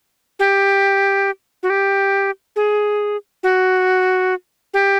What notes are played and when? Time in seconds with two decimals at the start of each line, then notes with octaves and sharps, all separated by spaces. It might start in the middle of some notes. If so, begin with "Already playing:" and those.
0.39 G4
1.63 F#4
1.70 G4
2.56 G#4
3.43 F#4
4.74 G4